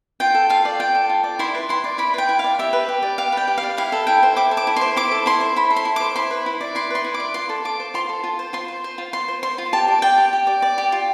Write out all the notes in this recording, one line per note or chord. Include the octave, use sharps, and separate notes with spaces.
F4 G5
A4
F4 F5
D5
F4 G5
A4
F4
D5
E4 C6
B4
E4 C6
D5
E4 B5
B4 G5
E4
D5 F5
G4 E5
B4
G4
D5
G4 F5
B4 G5
G4
F5
D5
E4 F5
A4
E4 G5
C5
E4 D6
A4
D6
E4
C5 C6
E4 D6
A4
E4 C6
C5
E4 B5
A4
C6
E4
C5 D6
E4 C6
B4
E4
D5
E4 C6
B4 C6
E4
D6
D5
F4 C6
A4
F4 D6
C5
F4 C6
A4
F4
C5
F4 C6
C5
C5
F4
F4 C6
C5
C5 C6
F4
G4 A5
D5
D5 G5
G4
G4
D5
D5
G4
F4